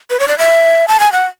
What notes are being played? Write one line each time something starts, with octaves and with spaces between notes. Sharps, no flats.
B4
C#5
D5
E5
A5
G#5
F#5